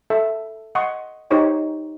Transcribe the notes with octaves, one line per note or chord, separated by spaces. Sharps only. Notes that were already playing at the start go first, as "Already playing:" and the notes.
A4 E5
D#5 F#5 C6 C#6 D#6
D#4 G4 C5 C#5 G5